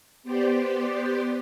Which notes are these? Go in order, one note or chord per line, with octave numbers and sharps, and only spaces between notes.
B3 G4 C5 D5